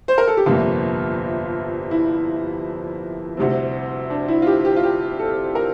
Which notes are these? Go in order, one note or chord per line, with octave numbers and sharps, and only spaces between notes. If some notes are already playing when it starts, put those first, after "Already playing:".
C5
A#4
A4
G4
G1 F2 C3 G3 A#3 F4
E4
D2 C3 G3 C4
D4
E4
F4
G4
G4
F4
G4
A4
A#4